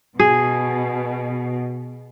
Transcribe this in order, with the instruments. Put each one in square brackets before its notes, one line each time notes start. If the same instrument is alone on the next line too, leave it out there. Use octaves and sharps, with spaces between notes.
[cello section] B2 [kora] G#4